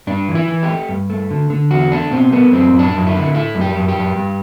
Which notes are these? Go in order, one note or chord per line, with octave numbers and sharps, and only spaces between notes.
G2 D4
E3
E4
E3
G4
A3
G2
A3
D3
D3
E2 F#4
A3 D4
B2 C4
A3 B3
F#2 C4
F#2
D4
F#2
E4
D3
A3 E4
F#2
G4
F#2
G4
F#2
G2